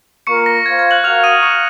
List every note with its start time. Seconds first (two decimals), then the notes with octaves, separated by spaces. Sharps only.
0.27 A#3 F4 A#4 C#6 C#7
0.46 A#6
0.66 F4 C5 F5 G#6
0.79 G#6
0.91 F#6 F#7
1.04 F#4 A#4 F5 F6 F7
1.23 D#6 D#7
1.43 C#6 C#7